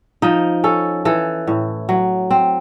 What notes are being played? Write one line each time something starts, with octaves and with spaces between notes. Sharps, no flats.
F3 D#4
C#4 A4
E3 A4
A2
F#3
C4